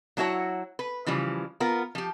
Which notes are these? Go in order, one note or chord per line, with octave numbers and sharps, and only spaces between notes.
F#3 D4 E4 F#4 C#5
B4
C#3 E3 F3 G3
B3 F4 A#4
F3 G4